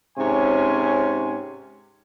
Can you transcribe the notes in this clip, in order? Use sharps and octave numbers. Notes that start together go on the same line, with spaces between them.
G#2 C3 C#4 C#5 G#5 C6